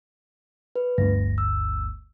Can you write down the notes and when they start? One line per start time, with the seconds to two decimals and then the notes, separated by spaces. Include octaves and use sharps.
0.76 B4
0.98 G1 D2 A#6
1.38 E6